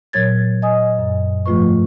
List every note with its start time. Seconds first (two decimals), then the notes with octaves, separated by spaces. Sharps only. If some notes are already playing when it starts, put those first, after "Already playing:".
0.13 A#2 F#3 C#5 G#6 A6
0.62 D#5 G#5 D#6
0.99 F#2
1.46 G#2 F3 A3 F4 B4 C#6